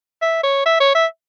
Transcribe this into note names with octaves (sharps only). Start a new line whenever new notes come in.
E5
C#5
E5
C#5
E5